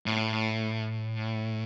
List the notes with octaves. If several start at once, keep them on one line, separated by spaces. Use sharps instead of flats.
A2